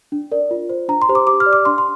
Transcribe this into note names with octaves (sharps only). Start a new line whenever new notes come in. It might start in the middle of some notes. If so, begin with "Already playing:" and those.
D4
A#4 D5
F4
C5
D4 A#5
C6
G4 C5
D6
G4 D6
F6
D5
D6
D4 C6
C6